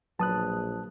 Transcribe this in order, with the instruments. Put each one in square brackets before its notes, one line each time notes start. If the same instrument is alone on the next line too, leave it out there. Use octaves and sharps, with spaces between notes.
[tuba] A#1 [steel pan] F#3 B4 [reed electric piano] A5 D#6 F#6